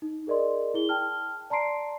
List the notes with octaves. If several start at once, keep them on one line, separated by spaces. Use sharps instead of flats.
D#4
G#4 A#4 D5 D#5 C6
E4 G#4 G7
G5 A5 F6
D5 A5 A#5 C6 C7 D7